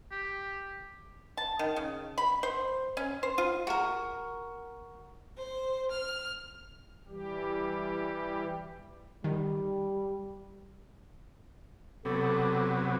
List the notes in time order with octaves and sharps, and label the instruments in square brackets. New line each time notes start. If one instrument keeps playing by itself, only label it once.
[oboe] G4
[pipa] A5
D#3
C#3
B5
C5
C#4
C5
F4
[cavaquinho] F#4 A#4
[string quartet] C5
F6
[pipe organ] E3 G3 G4
[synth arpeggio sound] D#3 [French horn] G3
[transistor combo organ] C3 F#3 B3 [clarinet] A4 [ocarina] D6